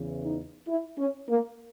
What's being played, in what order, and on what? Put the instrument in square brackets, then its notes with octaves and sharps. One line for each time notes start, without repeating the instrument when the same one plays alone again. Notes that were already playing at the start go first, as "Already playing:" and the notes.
Already playing: [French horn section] E2 C#3 E3
D#4
E4
C#4
A#3